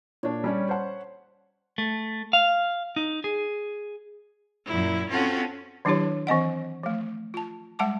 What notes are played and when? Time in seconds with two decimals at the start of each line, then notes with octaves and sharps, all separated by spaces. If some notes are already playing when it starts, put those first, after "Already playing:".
0.23 A#2 D4 C#5
0.44 G3 C#4 D5
0.69 C5 F#5
1.78 A3
2.33 F5
2.96 D#4
3.24 G#4
4.66 F#2 A#2 E4
5.09 C4 C#4 F4 F#4 A4
5.85 D#3 F#3 D4 E4 G4 C#5
6.27 E3 C4 D#5 F#5
6.83 F3 A3
7.34 F4 A5
7.79 G3 G#3 F#5 A5 D6